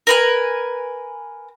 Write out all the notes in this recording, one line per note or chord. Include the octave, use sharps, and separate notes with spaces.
A#4 B4 G#5